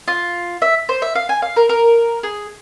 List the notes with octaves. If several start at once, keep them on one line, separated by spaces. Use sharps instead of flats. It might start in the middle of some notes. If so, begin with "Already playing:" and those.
F4
E5
C5
E5
F5
G#5
F5
A#4
A#4
G#4